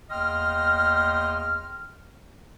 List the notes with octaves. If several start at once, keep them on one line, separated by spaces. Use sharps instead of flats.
E2 A#3 D#5 G5 C6 F6